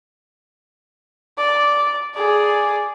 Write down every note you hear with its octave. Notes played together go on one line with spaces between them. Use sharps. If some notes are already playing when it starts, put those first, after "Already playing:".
D5
G#4 D5